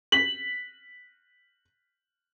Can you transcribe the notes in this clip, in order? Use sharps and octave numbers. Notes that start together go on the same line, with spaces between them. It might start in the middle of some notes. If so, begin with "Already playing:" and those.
B6 F#7